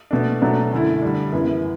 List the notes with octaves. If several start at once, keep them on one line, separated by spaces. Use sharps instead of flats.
B2 A3 D4
B2 F#3 A3 D4
F#2 D3 A3 E4
D3 G3 D4
F#2 C#3 E3 B3 E4